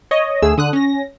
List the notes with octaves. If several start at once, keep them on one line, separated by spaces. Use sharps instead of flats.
C#5 D#5
D2 A3 G#4 E6
D3 D#6 F#6
C#4 A#6